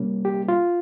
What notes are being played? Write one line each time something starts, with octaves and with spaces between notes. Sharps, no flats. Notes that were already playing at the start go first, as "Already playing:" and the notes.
Already playing: C3 G3 A#3 C#4
G4
F4